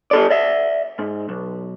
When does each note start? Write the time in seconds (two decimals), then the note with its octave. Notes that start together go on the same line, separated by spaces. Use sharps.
0.11 G4 A4 D5
0.30 D5 E5
0.99 G#2
1.29 B1